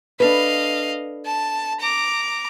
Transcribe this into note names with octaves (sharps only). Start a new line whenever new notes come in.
D4 A4 B4 D#5 F5
A5
A#5 D6